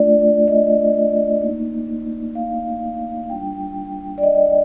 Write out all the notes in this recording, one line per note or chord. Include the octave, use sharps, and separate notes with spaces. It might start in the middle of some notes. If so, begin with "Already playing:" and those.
Already playing: A3 D4 F4 D5
D#5
A#3 D#4
F5
G3 D4 F4 G5
D5
D#5